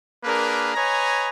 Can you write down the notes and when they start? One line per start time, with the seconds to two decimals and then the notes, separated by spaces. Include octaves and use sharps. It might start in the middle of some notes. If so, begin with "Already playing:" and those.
0.24 A#3 D4 G#4 A#4 B4
0.75 B4 C#5 D#5 G#5 A#5